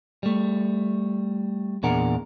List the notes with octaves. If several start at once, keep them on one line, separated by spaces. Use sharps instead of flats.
G3 A3
E2 A#2 D4 G#4 A#4 F#5